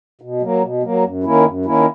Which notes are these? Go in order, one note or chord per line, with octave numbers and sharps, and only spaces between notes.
B2
F#3 A#3
B2
F#3 A#3
F#2
D#3 A#3 C#4 E4
F#2
D#3 A#3 C#4 E4